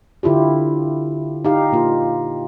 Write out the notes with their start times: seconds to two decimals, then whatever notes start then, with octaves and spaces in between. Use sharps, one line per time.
0.23 D3 E4 F4 G4
1.44 D#4 G4 F5
1.72 A#2 A#3 F4